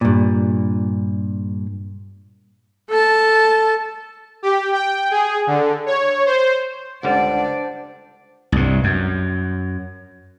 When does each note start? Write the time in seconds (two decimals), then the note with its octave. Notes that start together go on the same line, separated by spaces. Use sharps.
0.01 G2 A#2
2.90 A4 A5
4.43 G4
4.73 G5
5.11 G#4
5.47 D3
5.86 C#5
6.26 C5
7.03 C#2 D3 G3 D4 C5 D5 F#5
8.52 C2 G2
8.84 F#2